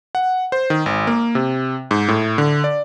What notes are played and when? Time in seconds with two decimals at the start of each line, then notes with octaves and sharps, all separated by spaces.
0.15 F#5
0.52 C5
0.70 D#3
0.86 G#1
1.07 A#3
1.35 C3
1.91 G#2
2.08 A2
2.38 D3
2.64 D5